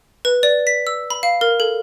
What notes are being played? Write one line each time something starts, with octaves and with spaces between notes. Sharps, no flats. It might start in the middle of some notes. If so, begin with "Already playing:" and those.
B4
D5
B6
E6
B5
F5
A#4
A4